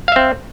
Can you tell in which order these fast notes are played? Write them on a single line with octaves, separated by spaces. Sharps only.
F5 E5 C4